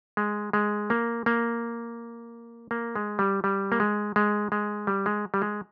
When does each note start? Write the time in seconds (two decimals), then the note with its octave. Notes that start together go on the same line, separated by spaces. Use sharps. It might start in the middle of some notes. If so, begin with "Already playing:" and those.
0.17 G#3
0.53 G#3
0.90 A#3
1.26 A#3
2.71 A#3
2.96 G#3
3.19 G3
3.44 G3
3.72 A#3
3.80 G#3
4.16 G#3
4.52 G#3
4.87 G3
5.06 G#3
5.34 G3
5.42 G#3